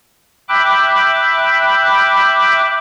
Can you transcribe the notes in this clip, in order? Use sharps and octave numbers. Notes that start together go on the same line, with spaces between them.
E5 G5 B5 D6 F#6